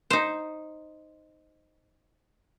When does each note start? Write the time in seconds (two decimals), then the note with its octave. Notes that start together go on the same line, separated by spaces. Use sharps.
0.10 D#4 C5